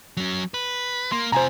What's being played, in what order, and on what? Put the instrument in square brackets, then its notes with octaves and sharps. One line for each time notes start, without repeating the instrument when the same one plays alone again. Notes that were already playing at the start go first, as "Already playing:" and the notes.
[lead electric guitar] F#3 C#4
B4
[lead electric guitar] A#3 [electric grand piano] C6
[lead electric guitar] C3 F4 [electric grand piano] C5 G#5 A#5